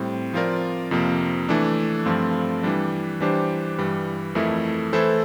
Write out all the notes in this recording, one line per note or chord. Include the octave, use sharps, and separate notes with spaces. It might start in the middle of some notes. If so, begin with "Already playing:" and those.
Already playing: A2 G3 C4
F3 C4 F4 A#4 D5
F2 C3 F3 A#3
E3 A3 D4
G2 F3 A3 C4 F4
E3 G3 D4
E3 G3 D4 G4 C5
G2 E3 G3
F2 E3 A3 E4 A#4
E3 A3 E4 A4 C5